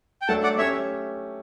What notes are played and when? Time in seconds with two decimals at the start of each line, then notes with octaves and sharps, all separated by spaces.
0.22 G5
0.28 F#3 A3 D4 A4 F#5 A5
0.43 D5 F#5
0.58 A3 C#4 G4 C#5 E5